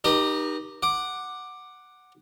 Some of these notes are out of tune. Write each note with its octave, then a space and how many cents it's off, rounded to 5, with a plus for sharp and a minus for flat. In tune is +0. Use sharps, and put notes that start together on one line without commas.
D#4 -20 G4 +0 A#4 +45
F#5 +0 D6 +10